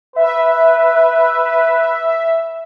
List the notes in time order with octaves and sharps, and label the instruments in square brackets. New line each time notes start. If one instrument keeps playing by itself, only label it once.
[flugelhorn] B4 [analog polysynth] E5